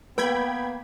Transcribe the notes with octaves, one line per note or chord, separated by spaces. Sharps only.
A#3 B3 B4 G5 B5 G#6